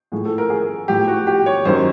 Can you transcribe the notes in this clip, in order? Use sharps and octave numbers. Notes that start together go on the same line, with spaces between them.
A2 F3 G#4
A4
A#4
G#4
A2 F3 G4
F#4
G4
C#5
F#2 D#3 F#3 C5